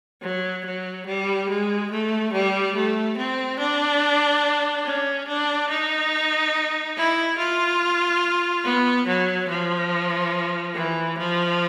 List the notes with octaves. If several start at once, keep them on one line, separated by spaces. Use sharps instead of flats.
F#3
F#3
G3
G#3
A3
G3
A3
C4
D4
C#4
D4
D#4
E4
F4
B3
F#3
F3
E3
F3